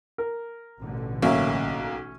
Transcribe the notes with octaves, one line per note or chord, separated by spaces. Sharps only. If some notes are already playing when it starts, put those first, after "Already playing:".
A#4
A1 B2 D3
B1 A#3 C#4 E5